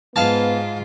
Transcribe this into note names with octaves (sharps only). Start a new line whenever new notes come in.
G#2 B3 F4 F5 G#5 A5